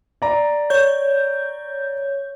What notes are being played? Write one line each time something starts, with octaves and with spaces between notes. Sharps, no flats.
D5 A#5
C#5 G6